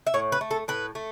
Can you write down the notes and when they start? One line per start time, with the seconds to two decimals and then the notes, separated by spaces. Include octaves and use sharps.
0.07 E5
0.14 A2 C#5
0.32 B4
0.41 A3
0.51 A4
0.68 A2 B4
0.95 A3